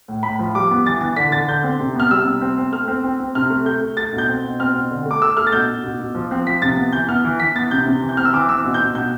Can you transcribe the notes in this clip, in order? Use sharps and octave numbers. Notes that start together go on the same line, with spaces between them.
A2
A2 B5
F3
G3 D6
B3
E3 A6
E3 A6
D3 B6
D3 A6
D3 G6
C4
C3
B3 F6
G3 E6
C3
C4
C4
A3 F6
C4
C4
C4
C3 F6
A3
A3 G6
A3
A3 A6
B2
G6
C4
B2
C4 F6
B2
D3
A3
D6
A3 E6
A3 F6
A6
B2 G6
B2
B2
B2
F3
C4
F3 B6
C3 A6
B3
E3 G6
B3 F6
E3
E3 B6
B3 A6
C3 G6
C3
E3
G6
C4 F6
E6
E3 D6
C4 E6
B2
G6
B2
B2 G6